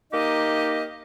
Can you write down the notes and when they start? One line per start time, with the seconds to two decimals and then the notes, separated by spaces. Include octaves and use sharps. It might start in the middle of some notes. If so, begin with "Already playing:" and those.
0.12 A#3 D#4 G4 D#5